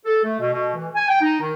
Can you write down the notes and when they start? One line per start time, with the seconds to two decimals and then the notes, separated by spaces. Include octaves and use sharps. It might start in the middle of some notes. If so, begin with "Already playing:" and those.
0.05 A4
0.24 A3
0.40 B2
0.53 B2
0.75 E3
0.95 G#5
1.08 G5
1.21 D#4
1.40 D#3